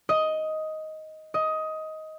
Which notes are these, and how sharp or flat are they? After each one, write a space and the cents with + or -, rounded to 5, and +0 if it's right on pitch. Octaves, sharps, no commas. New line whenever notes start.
D#5 +10
D#5 +15